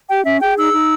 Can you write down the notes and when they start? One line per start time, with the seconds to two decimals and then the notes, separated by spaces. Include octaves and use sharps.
0.09 G4 G5
0.25 C#4 E5
0.41 G#4 G5
0.57 D#4 E6
0.73 D#4